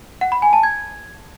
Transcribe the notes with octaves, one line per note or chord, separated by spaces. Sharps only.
F#5
B5
G#5
A5
G#6